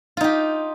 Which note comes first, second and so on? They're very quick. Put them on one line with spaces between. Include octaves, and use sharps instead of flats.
F4 D#4 G4